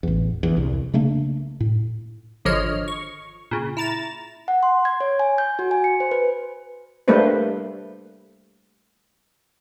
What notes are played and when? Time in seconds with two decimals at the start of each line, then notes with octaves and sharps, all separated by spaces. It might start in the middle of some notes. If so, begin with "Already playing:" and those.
0.03 A1 E2
0.43 A#1 E2
0.57 C2
0.94 C#3 A3 A#3 D4
1.60 A2
2.45 G#1 D3 F3 C#5 D#5 F6
2.88 C#6
3.51 A#2 C#3
3.77 E4 A#5 A6 E7
4.48 F#5
4.63 C6
4.85 G#6
5.00 C#5
5.19 G#5
5.38 G6
5.59 F#4
5.71 G#5
5.84 C#7
6.00 C5
6.11 B4
7.08 G3 A3 A#3 D4 B4 C5